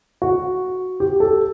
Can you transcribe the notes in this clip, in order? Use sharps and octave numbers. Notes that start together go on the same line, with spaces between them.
F#4
G4
A4